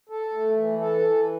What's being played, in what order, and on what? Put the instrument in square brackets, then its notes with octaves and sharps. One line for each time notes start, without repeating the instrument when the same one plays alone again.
[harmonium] A4
A3
E3
A4
E3